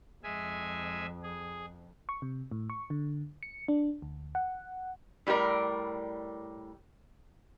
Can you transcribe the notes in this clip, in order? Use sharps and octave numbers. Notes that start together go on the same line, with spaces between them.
F2 G#3 E5 G#5
G#4
C#6
C3
A2
C#6
D3
C#7
D4
D2
F#5
A2 G3 B3 A#4 D5